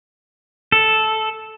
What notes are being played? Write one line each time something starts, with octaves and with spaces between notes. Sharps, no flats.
A4